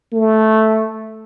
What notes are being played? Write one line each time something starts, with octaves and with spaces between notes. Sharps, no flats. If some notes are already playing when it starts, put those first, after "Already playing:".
A3